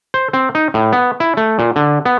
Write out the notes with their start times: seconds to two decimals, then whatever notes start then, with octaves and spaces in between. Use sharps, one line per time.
0.14 C5
0.33 C4
0.55 D#4
0.74 A2
0.93 B3
1.20 E4
1.37 A3
1.59 A#2
1.76 D3
2.05 B3